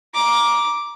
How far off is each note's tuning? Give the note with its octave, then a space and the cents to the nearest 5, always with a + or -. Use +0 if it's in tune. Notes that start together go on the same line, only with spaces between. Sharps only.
A#5 +20 D6 +0